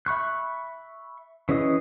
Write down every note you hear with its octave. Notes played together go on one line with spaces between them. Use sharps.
E5 B5 C#6 F#6
E3 C#4 G#4 D#5 D#6